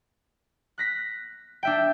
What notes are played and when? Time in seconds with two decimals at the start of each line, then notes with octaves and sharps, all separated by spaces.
0.78 F#6 A#6 B6
1.63 D4 E5 G5